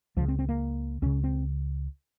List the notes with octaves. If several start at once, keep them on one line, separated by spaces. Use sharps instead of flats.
C#2 C#3 F3
C4
C4
A#3
C#2 C#3 C#4
C4